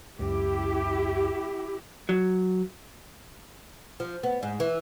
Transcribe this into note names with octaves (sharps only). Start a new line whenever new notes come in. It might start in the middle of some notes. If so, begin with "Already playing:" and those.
C#2 F#2 E4 G4
F#3
F3
B3
G#2
E3